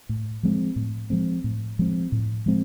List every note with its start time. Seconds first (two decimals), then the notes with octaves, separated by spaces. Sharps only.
0.09 A2
0.43 F3 G#3 C4
0.76 A2
1.10 F3 G#3 C4
1.44 A2
1.79 F3 G#3 C4
2.12 A2
2.46 F3 G#3 C4